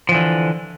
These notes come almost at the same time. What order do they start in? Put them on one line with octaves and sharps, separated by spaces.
F3 E3 D3